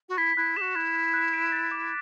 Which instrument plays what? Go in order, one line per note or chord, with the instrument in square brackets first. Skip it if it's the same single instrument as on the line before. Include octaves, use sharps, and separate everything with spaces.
[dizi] F#4
[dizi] E4 [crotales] B6
[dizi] E4 [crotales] F#6
[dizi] G#4 [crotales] E7
[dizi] F#4
[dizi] E4 [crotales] F#6
[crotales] F#6
F#6
D7
A6
D6